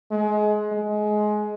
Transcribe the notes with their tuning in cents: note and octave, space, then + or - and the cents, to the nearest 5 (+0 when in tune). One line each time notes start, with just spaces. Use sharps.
G#3 +25
G#3 +20